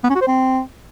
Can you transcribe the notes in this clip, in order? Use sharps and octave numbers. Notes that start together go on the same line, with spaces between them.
B3
C#4
F#4
C5
C4